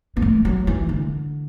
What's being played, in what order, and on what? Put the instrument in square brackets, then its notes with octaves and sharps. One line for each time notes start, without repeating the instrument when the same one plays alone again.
[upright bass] B3
A3
F#3
E3
D3